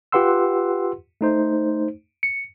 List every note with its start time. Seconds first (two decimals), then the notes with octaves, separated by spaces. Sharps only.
0.12 F4 G4 B4 F#5 C6 E6
1.21 A3 D#4 C5
2.23 C#7